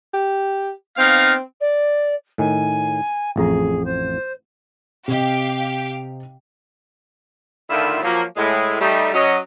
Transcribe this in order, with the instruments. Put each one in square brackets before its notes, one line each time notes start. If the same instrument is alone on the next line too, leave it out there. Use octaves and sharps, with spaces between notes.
[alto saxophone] G4
[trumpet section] B3 D#4 F5 [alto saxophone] C4
[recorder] D5
[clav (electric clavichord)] A2 D#3 [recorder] G#5
[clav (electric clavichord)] A1 F2 A#5 [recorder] G#4
[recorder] C5
[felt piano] C3 D#5 [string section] G4 F5
[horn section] A2 D3 D#3 E4 F4
F3 F#3 A#3
A2 G#3
G3 A3 D#4
F#3 C#4 D#5